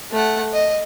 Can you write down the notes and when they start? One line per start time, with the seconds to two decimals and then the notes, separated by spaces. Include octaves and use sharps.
0.11 A3 F#5
0.53 D#5